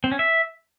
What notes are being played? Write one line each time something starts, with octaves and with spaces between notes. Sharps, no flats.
C4
C#4
E5